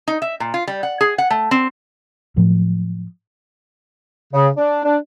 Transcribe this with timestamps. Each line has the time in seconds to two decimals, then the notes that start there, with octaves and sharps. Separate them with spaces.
0.08 D#4
0.22 E5
0.40 A#2
0.54 F4
0.67 G3
0.83 F#5
1.01 G#4
1.18 F#5
1.30 A3
1.51 C4
2.36 A2 F3 F#3
4.32 C#3
4.57 D4
4.84 D4